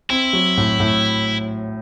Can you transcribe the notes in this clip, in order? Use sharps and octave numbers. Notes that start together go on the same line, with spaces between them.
C4 E4
F#3
A2
A2